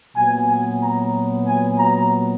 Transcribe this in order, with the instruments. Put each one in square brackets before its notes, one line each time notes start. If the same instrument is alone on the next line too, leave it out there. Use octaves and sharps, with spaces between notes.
[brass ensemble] A#2 F#3 B3 G#5
G#5
A#5
G#5
A#5